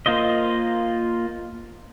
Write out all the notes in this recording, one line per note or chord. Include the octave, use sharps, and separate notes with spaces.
A#3 F4 C5 D#5